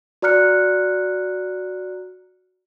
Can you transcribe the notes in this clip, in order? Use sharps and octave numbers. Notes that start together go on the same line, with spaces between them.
F#4 D5 A#5 F6 F#6 C#7